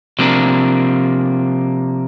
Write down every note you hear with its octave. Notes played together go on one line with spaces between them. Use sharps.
C3 F3 A#3 D4